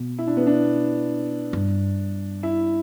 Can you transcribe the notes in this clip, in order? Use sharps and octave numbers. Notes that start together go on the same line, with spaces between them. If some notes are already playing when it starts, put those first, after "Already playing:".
Already playing: B2
E4
D4
B3
D4
G2
E4